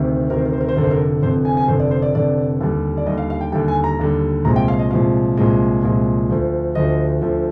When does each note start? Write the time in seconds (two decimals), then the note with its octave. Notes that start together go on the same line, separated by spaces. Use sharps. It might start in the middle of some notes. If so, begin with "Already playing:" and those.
Already playing: D2 C3 D#3
0.30 D2 C3 D#3 A#4
0.37 C5
0.45 A#4
0.53 C5
0.61 A#4
0.69 C5
0.76 F1 F2 D3 A#4
0.84 C5
0.91 A#4
1.22 F1 F2 D3 C5
1.45 G#5
1.57 G#5
1.68 F1 F2 D3 C5
1.80 D5
1.91 C5
2.02 D5
2.15 F1 F2 D3 D5
2.61 D#2 D3 G3
2.97 D5
3.06 D#2 D3 G3 D#5
3.18 F5
3.30 F5
3.41 G5
3.52 D#2 D3 G3 G5
3.68 G#5
3.84 A#5
3.99 D#2 D3 G3
4.45 C2 A#2 F3 G#3 A#5
4.56 G5
4.68 F5
4.79 D#5
4.91 C2 A#2 F3 G#3 F5
5.37 C2 A#2 F3 G#3
5.83 C2 A#2 F3 G#3
6.29 D2 D3 F3
6.75 D2 D3 F3 D#5
7.22 D2 D3 F3